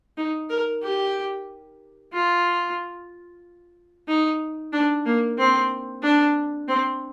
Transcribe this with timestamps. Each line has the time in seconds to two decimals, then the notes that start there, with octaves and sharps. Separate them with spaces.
0.17 D#4
0.49 A#4
0.82 G4
2.12 F4
4.08 D#4
4.73 D4
5.05 A#3
5.38 C4
6.03 D4
6.68 C4